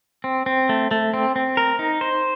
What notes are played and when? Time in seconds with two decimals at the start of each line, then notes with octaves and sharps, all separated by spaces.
0.24 C4
0.46 C4
0.69 A3
0.91 A3
1.14 C4
1.36 C4
1.57 A#4
1.79 D#4
2.01 C5